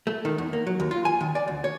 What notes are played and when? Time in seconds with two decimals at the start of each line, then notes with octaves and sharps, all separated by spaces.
0.07 A3
0.25 D#3
0.38 E2
0.53 A#3
0.67 F#3
0.80 D#2
0.91 F4
1.05 G#5
1.21 D#3
1.35 D5
1.48 D2
1.64 C#5